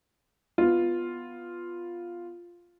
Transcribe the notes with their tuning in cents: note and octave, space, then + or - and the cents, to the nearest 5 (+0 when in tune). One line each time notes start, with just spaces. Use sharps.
B3 +0 F4 +0